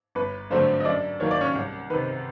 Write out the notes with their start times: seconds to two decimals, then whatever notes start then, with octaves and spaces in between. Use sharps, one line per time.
0.15 G1 B4
0.50 G2 D3 F#3 A3 C4 C5
0.80 D#5
0.85 F#2 D4 D5
1.20 D#3 F#3 A#3 C#5
1.31 D5
1.41 C#4 C#5
1.55 C2
1.90 C3 D#3 B4